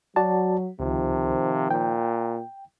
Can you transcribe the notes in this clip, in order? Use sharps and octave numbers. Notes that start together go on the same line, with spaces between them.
F#3 F#4 D5 A5
C#2 C3 D#3 F3
A#2 G5